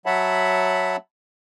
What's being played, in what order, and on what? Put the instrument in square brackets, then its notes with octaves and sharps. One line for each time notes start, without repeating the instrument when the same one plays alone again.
[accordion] F#3 C#5 E5 F#5 A5 B5